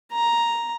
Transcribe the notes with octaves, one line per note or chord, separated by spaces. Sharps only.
A#5